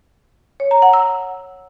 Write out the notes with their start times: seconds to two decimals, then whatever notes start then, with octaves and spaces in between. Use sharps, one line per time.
0.60 C#5
0.71 A#5
0.82 F#5
0.93 E6